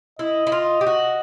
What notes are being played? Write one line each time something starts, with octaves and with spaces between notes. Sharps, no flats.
E4 D#5
E4
F4
G4
F#4